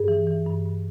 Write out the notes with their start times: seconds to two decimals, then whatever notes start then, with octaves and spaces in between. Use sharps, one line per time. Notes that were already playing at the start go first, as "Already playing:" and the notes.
Already playing: G2 G#4
0.08 E3
0.27 E3
0.46 G2
0.65 G2